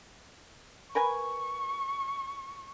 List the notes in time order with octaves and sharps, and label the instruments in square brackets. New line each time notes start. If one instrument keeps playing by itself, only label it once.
[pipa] A#4 B4 G#5 [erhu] C#6